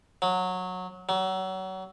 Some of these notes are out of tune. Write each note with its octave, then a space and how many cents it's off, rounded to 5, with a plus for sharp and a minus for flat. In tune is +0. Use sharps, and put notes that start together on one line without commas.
F#3 -15
F#3 +30